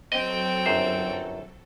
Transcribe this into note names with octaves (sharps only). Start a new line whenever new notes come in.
F#3 C4 A4 D#5 G5
G1 F#2 C5